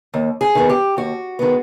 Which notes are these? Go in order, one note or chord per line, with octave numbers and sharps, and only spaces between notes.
D#2
G#4
D#3 G#3 B3
G4
D#2 F#4
D#3 G#3 B3